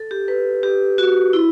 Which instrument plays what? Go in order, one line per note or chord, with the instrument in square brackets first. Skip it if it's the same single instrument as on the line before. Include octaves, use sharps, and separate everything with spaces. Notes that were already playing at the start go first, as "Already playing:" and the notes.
Already playing: [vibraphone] A4
G4
B4
G4
F#4
E4